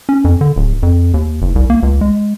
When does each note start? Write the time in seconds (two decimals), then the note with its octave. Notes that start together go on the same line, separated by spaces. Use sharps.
0.09 C#4
0.25 F2
0.41 D3
0.56 D1
0.83 F2
1.14 D#2
1.42 F#1
1.55 C2
1.70 A#3
1.83 C#2
2.01 G#3